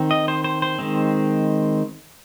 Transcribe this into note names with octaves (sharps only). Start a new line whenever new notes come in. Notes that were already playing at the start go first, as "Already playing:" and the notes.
Already playing: D#3 C4
D#5
C5
C5
C5
D#3 G#3 C4